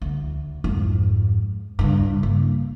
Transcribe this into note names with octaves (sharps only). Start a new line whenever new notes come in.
D2
F2 G#2
G2 C#3
A#3